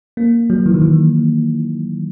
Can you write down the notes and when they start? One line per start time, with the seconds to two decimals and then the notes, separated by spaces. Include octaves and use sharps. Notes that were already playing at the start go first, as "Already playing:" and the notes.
0.17 A#3
0.50 F#3
0.66 E3
0.74 D#3
0.82 E3